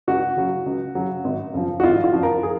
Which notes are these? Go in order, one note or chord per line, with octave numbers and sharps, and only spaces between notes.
C#2 F#4
C#3 F#3
C#2
C#3 F#3
G#1
F#2 C#3 F3
F#4
G#1 F4
F4
F#2 C#3 F3
A#4
G#4